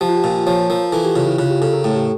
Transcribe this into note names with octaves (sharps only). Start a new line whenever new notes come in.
F3 G4
F4
G4
A#2
F3 C#5
F3 A#4
E3 A4
G4
C#3 F4
E4
C#3 F4
G4
C#3 A4
A#4
A2 A4
G4